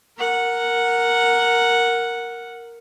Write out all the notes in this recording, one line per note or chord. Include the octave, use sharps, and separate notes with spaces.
A#4 F#5